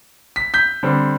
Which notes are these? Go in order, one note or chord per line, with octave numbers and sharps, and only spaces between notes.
B6
G6 B6
D3 G3 C4